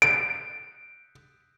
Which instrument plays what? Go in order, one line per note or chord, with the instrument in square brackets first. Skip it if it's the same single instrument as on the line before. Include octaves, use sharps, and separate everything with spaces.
[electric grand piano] D7